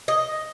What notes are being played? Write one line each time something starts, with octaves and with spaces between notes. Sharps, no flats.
D#5